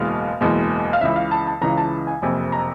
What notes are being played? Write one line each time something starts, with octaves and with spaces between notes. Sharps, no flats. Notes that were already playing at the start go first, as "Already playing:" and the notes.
Already playing: F#1 E2 B2 G#3 F5
F#1 E2 B2 G#3
F5
C#2 C#3 E3 E5
F5
A5
A5
C#2 C#3 E3 A#5
A5
G#5
F#1 F2 C3 G#5
A#5